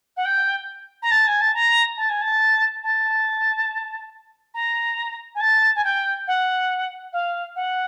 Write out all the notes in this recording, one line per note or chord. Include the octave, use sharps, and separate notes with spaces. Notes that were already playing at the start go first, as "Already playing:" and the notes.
F#5
G5
A#5
A5
G#5
A5
A#5
A5
G#5
A5
A5
A#5
G#5
A5
G#5
G5
F#5
F5
F#5